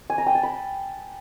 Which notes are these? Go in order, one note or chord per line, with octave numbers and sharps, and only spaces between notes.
G#5
A#5
G5
A5
B5